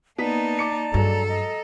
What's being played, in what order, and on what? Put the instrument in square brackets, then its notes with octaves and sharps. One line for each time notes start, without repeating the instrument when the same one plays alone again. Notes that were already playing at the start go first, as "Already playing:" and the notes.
[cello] A#3 D#4 [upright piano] B3 B6 [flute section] D5 A5 A#5
[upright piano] D6 C#7
[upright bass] G2 [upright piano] F#3 G#3 [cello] A4
[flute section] D#5 A#5